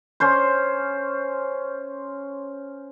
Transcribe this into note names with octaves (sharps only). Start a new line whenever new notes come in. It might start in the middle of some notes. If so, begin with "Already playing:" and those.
C#4 C5 C6